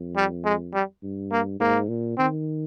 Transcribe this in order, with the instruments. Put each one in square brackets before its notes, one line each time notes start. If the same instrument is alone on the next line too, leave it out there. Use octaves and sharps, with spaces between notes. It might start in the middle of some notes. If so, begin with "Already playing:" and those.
Already playing: [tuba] F2
[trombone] G3
G#3
G3
[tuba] G2
[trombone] A#3
[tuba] G#2 [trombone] A#3
[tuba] A#2
[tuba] D#3 [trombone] C4